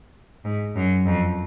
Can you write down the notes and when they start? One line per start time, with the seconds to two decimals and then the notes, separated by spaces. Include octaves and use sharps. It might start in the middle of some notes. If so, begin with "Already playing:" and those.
0.45 G#2
0.76 F#2
1.07 F2